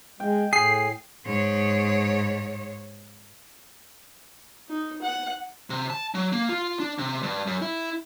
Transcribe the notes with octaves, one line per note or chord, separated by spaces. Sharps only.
G#3 G5
A2 G#4 C7
G#2 C#5
D#4
F#5
C3
A5
F#3
A#3
F4
D4
C3
G2
F#2
E4